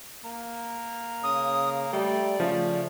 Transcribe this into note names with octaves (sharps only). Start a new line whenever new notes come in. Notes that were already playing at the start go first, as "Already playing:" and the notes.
A#3
C#3 D#6
G3 A3 D5
C#3 F3 A3